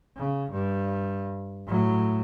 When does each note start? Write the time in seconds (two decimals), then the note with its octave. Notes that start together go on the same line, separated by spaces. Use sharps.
0.16 C#3
0.51 G2
1.66 A2 F#3